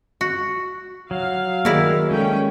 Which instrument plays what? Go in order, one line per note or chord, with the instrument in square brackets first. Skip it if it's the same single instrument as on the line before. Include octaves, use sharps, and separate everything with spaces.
[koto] F#4
[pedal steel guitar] F#3 [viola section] F5
[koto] D#3 E4 D5 [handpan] A#3 G#4
[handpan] G#3 A4 [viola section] C#4 G5